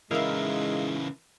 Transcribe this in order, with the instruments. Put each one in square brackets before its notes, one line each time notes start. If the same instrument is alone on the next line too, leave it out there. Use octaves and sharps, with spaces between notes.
[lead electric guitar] C#3 E3 [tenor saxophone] G#3 [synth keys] D#4 E4 F5 [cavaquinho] A#4 E5